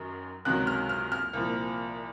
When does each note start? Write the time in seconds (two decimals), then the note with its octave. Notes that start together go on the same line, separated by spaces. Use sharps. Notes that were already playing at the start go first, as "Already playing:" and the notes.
Already playing: F#2 D#3 F#3
0.45 C#2 C3 D#3 F#3 F#6
0.67 F6
0.89 F6
1.12 F6
1.33 C2 A#2 F3